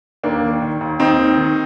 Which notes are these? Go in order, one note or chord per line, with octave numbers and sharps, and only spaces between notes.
D#2 A#3 D4
D#3
D#3
D#2
D#2 C4 D#4
D#3
D#3